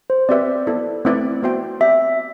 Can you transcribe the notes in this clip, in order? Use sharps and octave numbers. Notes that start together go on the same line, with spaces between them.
C5
C4 G4 B4 D5 E5
B3 E4 A4
A3 C4 E4 B4 D5
B3 F#4 C5 E5 G5
C4 G4 D5 E5 G5